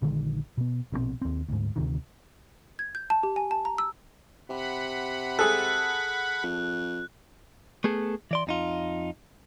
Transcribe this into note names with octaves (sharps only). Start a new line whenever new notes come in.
A#1 D3 D#3 G#3
B2 B3
A#1 B2 F3 C4
D#2 C4
D2 G#2
D2 C3 D#3
G#6
G6
A5
G4
G#5
A5
A#5
E6
C3 F#5 B5
G#4 A4 F#6
F2
A3 B3 G#4 A4
E3 D5 C6
F2 D#4 F4